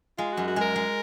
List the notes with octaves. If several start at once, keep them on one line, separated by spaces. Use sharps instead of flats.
G#3 F4
F#2 F#4
F#4
G#3 A#4
G#3